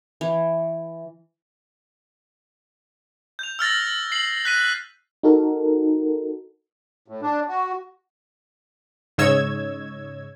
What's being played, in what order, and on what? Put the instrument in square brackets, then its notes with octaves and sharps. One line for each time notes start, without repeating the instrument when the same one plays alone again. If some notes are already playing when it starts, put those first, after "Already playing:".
[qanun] E3
[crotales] G6 F7
E6 F6 A6 A#6
C7 F#7
F#6 B6 D#7
[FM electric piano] D#4 F#4 A4 A#4
[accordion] A2
D4
F#4
[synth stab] G#2 C#3 C#5 D#5 E6 G#6